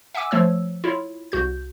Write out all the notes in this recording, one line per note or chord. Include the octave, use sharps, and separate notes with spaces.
E5 F#5 G#5 D6 E6
F3 A3 C#5 E6
E4 F4 C#5
C2 F#4 G6